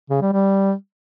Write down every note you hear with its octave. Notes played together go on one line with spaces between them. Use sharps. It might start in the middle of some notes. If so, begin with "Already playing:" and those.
C#3
G3
G3